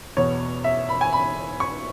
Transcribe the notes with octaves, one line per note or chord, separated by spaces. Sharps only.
E2 B2 B3 C#5
E5
B5
G#5
B5
C#6